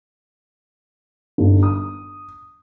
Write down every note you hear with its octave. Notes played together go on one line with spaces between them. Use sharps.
G1
D#6